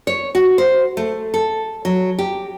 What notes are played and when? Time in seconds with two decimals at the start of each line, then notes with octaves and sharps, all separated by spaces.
0.07 C#5
0.35 F#4
0.58 C5
0.97 A3
1.34 A4
1.85 F#3
2.19 G4